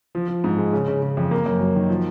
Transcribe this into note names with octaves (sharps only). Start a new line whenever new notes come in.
F3
F3
G#2
G#3
C#3
C#3
C#3
F2
A#3
F#2
F#3
D#3
F3